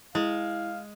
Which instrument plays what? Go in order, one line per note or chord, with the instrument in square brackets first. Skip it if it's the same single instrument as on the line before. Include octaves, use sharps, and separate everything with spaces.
[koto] G#3 [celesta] E4 [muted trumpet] F5